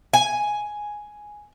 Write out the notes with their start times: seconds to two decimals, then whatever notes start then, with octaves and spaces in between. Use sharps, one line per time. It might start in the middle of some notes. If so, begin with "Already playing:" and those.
0.14 G#5